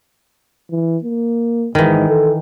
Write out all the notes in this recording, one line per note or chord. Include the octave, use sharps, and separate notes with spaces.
E3
A#3
G#2 D#3 E3
A4